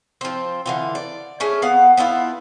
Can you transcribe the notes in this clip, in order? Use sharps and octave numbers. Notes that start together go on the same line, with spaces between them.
F3 C4
D3 E3 F4
D5
A3 C#4 G#4
B3 F5 F#5
B3 D4 E4 F4